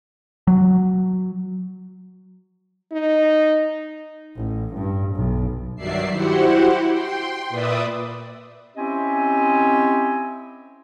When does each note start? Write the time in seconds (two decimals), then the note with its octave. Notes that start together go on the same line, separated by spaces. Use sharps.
0.47 F#3
2.92 D#4
4.36 A1
4.75 G2
5.16 B1
5.76 G2 D#3 F#3 D5 E5 C7
6.11 E4 F#4 G4 C5 F#5
6.90 G5 C6
7.49 A#2 B4 D5 E5 D#6
8.77 C4 C#4 E4 G4 D#5 G#5